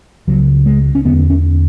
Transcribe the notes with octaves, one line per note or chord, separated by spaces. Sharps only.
C#2 C#3 F#3
G#3
C#4
E2 D3 B3
C#4